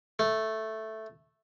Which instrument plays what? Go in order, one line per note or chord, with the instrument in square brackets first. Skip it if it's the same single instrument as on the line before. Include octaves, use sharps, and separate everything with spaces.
[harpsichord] A3